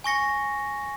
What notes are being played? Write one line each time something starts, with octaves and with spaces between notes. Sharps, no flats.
G#5 C#6 A#6 C#7